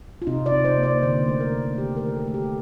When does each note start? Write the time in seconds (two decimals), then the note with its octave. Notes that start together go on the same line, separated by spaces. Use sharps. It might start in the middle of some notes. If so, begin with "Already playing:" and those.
0.22 F4
0.27 C3 D#4
0.46 D5
0.52 C3
0.65 C5
0.77 A#3
0.83 D5
1.03 D3 C5
1.27 A3 C5
1.40 A#4
1.53 A3
1.78 D#3 G4
1.97 A#4
2.03 A3
2.16 A4
2.27 A3
2.34 G4